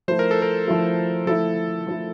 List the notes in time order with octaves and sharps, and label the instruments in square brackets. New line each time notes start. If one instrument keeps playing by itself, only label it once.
[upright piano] F3 A3 E4 [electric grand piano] C5
[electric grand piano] A#4
A4
A#4
[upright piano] F3 A3 E4
[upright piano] F3 A3 E4 [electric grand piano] A4
[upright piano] F3 A3 E4